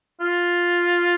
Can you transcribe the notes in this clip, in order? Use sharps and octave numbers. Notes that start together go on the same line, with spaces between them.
F4